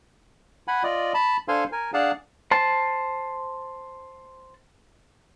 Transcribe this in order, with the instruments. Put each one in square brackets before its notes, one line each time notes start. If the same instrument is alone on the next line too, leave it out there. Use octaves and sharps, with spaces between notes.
[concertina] F#5 G#5 B5
F4 D5 D#5
A5 B5
D4 A4 C5 F5 G#5 C6
A#4 G#5
D4 G#4 D5 F5 F#5 A5
[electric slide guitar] C5 A5